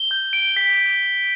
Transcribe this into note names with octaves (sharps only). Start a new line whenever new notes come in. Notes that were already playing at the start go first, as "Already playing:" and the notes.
Already playing: G7
G6
D7
B6